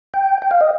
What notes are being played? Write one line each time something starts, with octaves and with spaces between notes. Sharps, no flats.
G5
G5
F5
D#5